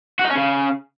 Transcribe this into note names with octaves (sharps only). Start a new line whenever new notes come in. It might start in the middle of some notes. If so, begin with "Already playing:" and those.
F#4
D#4
C#4
C#3